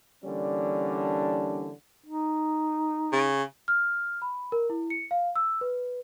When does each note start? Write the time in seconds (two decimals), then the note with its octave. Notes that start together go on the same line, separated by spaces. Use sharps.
0.25 D3 E3 G3 A#3 C#4 D4
2.06 D#4
3.13 C#3
3.68 F6
4.22 B5
4.52 A#4
4.70 E4
4.90 C#7
5.11 F5
5.36 E6
5.61 B4